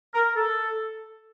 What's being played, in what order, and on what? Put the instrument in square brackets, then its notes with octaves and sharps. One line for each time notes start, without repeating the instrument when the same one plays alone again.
[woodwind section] A#4
A4